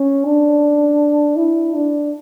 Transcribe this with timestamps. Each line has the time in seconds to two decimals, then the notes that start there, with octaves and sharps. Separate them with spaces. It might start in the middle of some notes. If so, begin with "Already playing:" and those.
Already playing: C#4
0.26 D4
1.36 E4
1.74 D4